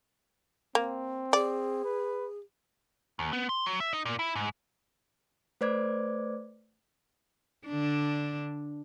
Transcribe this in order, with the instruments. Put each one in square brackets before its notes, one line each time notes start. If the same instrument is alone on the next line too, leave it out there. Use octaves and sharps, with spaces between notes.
[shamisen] A#3 [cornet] C4
[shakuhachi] G#4 [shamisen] D5
[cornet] B4
[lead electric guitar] D#2
B3
C6
F#3
E5
D#4
A#2
E4
G#2
[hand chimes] A3 B4 C5 D5 D6 G#6
[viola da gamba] D3 D4